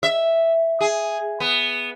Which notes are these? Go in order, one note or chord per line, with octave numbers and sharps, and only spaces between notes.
E5
G#4
B3